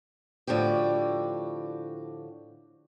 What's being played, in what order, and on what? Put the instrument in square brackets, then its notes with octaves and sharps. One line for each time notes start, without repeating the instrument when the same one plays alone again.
[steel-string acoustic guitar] A2 D3 F3 F#4 G4